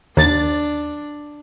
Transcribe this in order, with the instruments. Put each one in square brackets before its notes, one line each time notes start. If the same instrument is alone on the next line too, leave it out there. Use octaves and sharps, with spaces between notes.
[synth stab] D#2 A6 [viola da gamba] D4